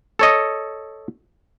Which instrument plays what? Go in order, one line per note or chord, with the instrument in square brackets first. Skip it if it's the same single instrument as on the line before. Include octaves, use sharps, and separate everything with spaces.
[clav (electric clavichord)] A4 C#5 D#5